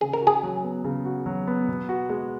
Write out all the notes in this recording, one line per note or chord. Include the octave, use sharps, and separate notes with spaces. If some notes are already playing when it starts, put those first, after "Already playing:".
C#3 G#4
A#4
F#4
G#4
F#3
B3
C#3
F#4
F#3
B3
B2
F#4
G#3